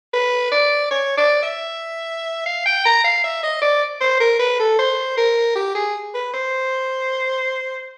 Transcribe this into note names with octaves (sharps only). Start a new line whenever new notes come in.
B4
D5
C#5
D5
E5
F5
G5
A#5
F5
E5
D#5
D5
C5
A#4
B4
A4
C5
A#4
G4
G#4
B4
C5